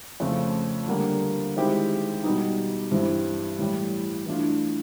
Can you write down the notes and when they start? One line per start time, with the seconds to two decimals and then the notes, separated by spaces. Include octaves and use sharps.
0.20 F2 C#3 F3 A3 C4
0.88 D3 G3 A#3 D4
1.56 D#3 G#3 C4 E4 G4
2.24 B2 G3 B3 D#4
2.91 G2 E3 G3 C4 E4
3.59 A2 E3 G3
4.26 E3 A3 D4 F4